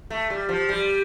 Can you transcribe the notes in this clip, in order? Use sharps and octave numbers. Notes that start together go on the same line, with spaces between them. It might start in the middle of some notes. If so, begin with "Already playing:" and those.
A3
G3
F3
G3